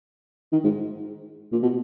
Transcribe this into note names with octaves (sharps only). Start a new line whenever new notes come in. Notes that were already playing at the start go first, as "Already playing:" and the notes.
D#3
G#2
A#2
B2